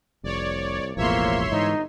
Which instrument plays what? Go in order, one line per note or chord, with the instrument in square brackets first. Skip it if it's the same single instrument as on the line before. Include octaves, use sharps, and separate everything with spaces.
[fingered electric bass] F1 [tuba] C2 [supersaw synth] C#5 D5
[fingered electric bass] E1 A1 E2 [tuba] F3 [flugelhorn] A#3 [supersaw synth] C#5 E5 C6
[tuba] G1 [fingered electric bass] G#2 E3 [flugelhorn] D#4